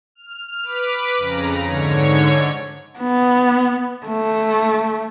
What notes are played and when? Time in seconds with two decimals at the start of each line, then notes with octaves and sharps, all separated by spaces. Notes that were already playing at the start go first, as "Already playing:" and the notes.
0.15 F6
0.63 B4 D6 B6
1.18 F2 C#3 A#5
1.65 G#2 D3 C#5
2.99 B3
4.07 A3